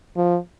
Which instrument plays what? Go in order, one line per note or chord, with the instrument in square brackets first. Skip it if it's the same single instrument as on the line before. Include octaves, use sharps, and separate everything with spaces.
[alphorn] F3